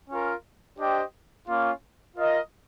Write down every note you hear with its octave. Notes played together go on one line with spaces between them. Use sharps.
C#4 F4 A#4
D4 G4 C5 D#5 G5
A#3 C#4 F4
F4 A#4 D#5